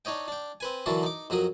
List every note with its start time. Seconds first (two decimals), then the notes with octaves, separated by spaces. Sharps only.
0.05 D4 D#4 C#5 D#5 G5
0.28 D4 G5
0.60 C4 B4 G#5
0.86 D3 E3 F#3 F#4 A4 A#4
1.03 D#4 D6
1.30 F2 F#3 F#4 A#4 D#6